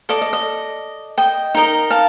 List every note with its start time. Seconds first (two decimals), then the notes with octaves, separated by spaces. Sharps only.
0.09 A4 D5 D#5
0.22 D#5
0.33 D#5
1.18 D#5 G5
1.54 D#4 A#4 D#5
1.90 F5 A5